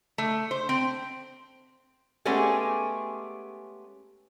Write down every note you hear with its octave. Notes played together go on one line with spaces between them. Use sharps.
A3
C5
C4
G#3 A3 B3 C#4 G4 G#4